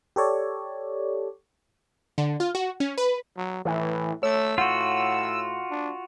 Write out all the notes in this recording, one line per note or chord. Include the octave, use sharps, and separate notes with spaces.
G4 A4 C#5 D5
D3
F4
F#4
C#4
B4
F#3
A2 E3
A3 C#5 E6
A2 F4 F#4 F#5
D4